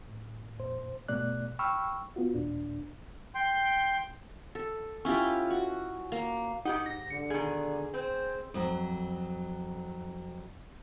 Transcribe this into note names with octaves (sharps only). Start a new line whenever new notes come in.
A2
F2 A#2 C5
G2 B2 A3 D5 F#6
G5 B5 C#6 E6 F6
B3 F4 F#4
D#2 A#2 D4
G5 C6
A4
C#4 E4 F4 G4
F#4
A#3
G#2 D#4 G4 F#5
A#6
D3 C#7
B2 D#3 G#4
C4 C5
F2 F#3